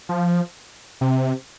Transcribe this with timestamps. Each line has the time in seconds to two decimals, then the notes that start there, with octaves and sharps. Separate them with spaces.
0.09 F3
1.01 C3